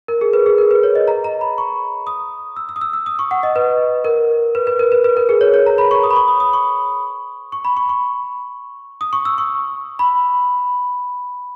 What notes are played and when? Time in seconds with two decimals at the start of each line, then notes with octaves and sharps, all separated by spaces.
0.08 A#4
0.21 G#4
0.33 B4
0.46 G#4
0.58 A#4
0.71 B4
0.83 C#5
0.95 D#5
1.08 A#5
1.24 A#5
1.41 B5
1.58 C#6
2.07 D#6
2.56 E6
2.69 E6
2.76 D#6
2.81 E6
2.93 E6
3.06 D#6
3.19 C#6
3.31 F#5
3.43 D#5
3.56 B4
4.05 A#4
4.55 B4
4.67 B4
4.79 A#4
4.92 B4
5.04 B4
5.17 A#4
5.29 G#4
5.41 C#5
5.54 C#5
5.66 A#5
5.78 B5
5.91 C#6
6.03 D#6
6.11 B5
6.16 C#6
6.28 D#6
6.40 D#6
6.53 C#6
7.52 C#6
7.65 B5
7.77 C#6
7.89 C#6
9.01 D#6
9.13 C#6
9.25 E6
9.38 C#6
9.99 B5